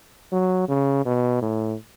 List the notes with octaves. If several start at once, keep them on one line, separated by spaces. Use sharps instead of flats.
F#3
C#3
B2
A2